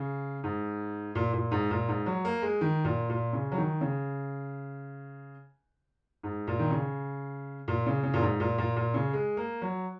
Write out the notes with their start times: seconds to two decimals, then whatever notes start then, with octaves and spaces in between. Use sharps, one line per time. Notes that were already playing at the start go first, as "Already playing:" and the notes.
Already playing: C#3
0.44 G#2
1.15 A#2
1.33 A#2
1.51 G#2
1.71 A#2
1.88 G#2
2.06 F#3
2.25 A#3
2.42 G#3
2.61 D#3
2.85 A#2
3.10 A#2
3.33 C#3
3.52 F#3
3.58 D#3
3.81 C#3
6.23 G#2
6.47 A#2
6.59 D#3
6.71 C#3
7.68 A#2
7.86 C#3
8.03 C#3
8.14 A#2
8.22 G#2
8.40 A#2
8.58 A#2
8.76 A#2
8.94 C#3
9.13 G#3
9.37 A#3
9.62 F#3